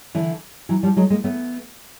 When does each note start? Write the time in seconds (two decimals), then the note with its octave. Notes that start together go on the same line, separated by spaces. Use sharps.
0.15 D3 E3
0.69 E3 F#3
0.83 F3 G3
0.96 F#3 G#3
1.10 G#3 A#3
1.24 A3 B3